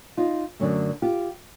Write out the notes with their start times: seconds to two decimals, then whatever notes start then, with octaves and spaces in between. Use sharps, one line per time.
0.17 D#4 F4
0.59 F#2 D3 F#3 A3
1.02 F4 G4